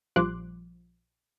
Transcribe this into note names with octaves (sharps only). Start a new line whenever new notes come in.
A#1 F3 G3 C6 D6 F#6